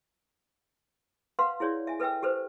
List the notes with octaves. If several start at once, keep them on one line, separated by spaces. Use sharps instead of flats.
B4 F5 F#5 C6
E4 G#4 C#5 D5
E5 G#5
A4 B4 E5 G5 E6
G4 A4 B4 C5